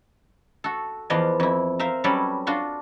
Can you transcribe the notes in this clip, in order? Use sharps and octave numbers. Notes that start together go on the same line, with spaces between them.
F#4 A4
E2 F3 B3 F4 D5 D#5
F2 E4
A#4 C5 E5 F5 A#5
F#3 G3 C#4 A4 B4 D5
D4 F4 F#4 C6